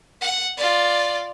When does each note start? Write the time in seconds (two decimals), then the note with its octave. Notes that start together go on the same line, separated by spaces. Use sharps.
0.21 F#5
0.57 F4 D5